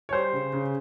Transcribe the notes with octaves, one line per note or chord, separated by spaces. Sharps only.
C#5
G3 C5
C#3
C#3